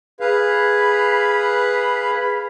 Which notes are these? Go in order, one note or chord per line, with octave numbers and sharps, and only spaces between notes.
G#4 B4 F5 B5